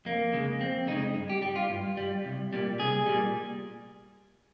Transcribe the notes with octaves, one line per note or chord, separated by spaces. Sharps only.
F2 A#3
C#3 G#3
F2 C4
C#3 G#3 D#4
G2
G4
G3 G4
F4
G2
G3
C2
A#2 G3
C2 G#4
A#2 G3